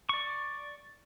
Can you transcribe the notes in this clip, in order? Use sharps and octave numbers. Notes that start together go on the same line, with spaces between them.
D5 C#6